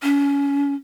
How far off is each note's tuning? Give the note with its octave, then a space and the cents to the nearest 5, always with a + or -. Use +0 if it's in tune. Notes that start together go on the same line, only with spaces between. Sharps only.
C#4 +30